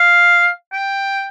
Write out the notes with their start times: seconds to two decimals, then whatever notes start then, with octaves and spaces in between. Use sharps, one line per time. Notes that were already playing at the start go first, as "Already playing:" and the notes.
Already playing: F5
0.73 G5